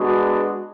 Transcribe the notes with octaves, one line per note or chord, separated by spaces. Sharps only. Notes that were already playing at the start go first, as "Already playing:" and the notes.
Already playing: G#3 B3 D4 F#4